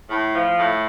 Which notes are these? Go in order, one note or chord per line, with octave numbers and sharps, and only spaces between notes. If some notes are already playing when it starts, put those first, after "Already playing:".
A2
F3
A2